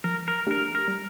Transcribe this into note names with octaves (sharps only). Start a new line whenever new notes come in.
F3 A#4
A#4
A3 D4 G4 A#4
A#4
G3